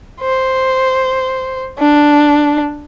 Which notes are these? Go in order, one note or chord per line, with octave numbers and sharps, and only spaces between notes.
C5
D4